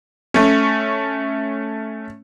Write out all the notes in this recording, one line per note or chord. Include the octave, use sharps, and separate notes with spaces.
A3 C#4